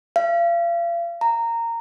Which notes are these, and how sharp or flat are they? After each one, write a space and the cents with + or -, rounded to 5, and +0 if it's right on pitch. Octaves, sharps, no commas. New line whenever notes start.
F5 -40
A#5 -15